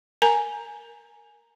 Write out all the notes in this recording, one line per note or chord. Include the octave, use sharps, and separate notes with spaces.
A#4 G#5 A#5